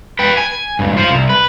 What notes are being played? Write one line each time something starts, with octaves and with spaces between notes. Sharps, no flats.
B4 G5
G#5
C#2 G2
F4 C5
C2
B4